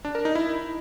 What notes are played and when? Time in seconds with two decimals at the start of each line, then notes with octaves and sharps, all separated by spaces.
0.05 D4
0.15 A#4
0.25 D#4
0.35 E4